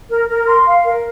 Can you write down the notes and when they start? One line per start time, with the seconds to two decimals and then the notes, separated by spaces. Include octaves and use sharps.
0.09 A#4
0.28 A#4
0.47 C6
0.65 F5
0.85 A#4